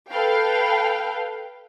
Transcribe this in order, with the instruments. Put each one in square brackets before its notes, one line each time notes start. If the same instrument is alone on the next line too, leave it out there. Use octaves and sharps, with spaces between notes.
[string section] A4 B4 F5 G5